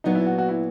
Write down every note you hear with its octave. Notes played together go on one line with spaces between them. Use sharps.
A#2 F#3 B3 D#4
E4
F#4
F#4
E4